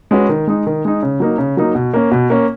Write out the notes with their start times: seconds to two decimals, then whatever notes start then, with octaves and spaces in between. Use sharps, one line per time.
0.11 G#3 C#4 F#4 B4
0.29 D#3
0.47 G#3 D#4
0.67 D#3
0.85 G#3 D#4
1.03 C#3
1.20 F#3 A#3 D#4
1.38 C#3
1.57 F#3 A#3 D#4
1.75 B2
1.94 A#3 C#4
2.11 B2
2.30 A#3 C#4